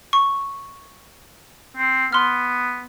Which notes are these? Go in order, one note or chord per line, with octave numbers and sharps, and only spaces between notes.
C#6
C4
B3 C6 F6